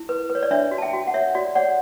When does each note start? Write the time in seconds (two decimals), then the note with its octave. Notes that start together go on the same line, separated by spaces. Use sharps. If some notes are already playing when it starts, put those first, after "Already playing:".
Already playing: E4
0.09 B4
0.30 B4
0.35 C#5
0.43 D5
0.51 D4 C#5 E5
0.71 F#4
0.78 A5
0.82 E5 G5
0.93 F#4
1.07 F#5
1.14 C#5 E5
1.35 F#4 D5
1.55 C#5 D5 F#5